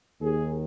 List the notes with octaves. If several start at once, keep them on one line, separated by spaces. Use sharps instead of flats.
D#2 D#3 G#4